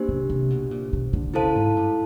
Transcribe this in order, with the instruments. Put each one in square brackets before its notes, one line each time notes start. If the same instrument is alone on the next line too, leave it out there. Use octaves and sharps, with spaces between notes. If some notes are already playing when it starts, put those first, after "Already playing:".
Already playing: [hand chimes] A#3 D4 G4 C5
[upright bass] C3
C3
B2
A#2
B2
D3
[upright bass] C#3 [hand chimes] E4 A4 C5 F5 A5
[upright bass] G#2
G2